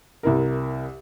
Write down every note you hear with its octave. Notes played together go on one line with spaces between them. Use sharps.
C2 E4 A#4